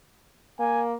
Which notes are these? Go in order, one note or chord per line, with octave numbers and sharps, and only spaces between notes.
A#3 G#5